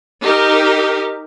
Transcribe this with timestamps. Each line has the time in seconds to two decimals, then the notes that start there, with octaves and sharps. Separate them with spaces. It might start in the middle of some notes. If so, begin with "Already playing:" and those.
0.22 D#4 G4 A#4